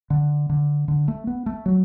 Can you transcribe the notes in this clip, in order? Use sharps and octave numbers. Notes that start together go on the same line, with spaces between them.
D3
D3
D3
A3
B3
A3
F#3